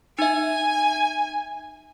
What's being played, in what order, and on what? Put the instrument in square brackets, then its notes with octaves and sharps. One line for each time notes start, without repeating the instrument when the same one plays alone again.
[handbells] D#4 E5 [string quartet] G#5